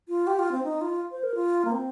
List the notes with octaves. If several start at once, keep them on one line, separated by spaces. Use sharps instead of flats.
F4
G4
F4
C4
D#4
F4
C5
A#4
F4
A#3
C4